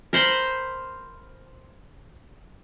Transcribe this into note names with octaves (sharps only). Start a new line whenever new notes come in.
A#4 C5 B5 C6